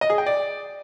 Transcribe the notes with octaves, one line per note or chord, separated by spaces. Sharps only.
D#5
G#4
G5
D5